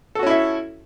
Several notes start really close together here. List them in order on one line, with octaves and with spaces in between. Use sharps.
A4 F#4 C#4 E4 E5